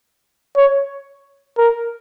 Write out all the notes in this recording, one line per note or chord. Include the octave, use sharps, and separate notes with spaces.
C#5
A#4